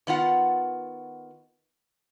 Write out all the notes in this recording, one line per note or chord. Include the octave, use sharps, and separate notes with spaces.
D#3 B3 F4 F#5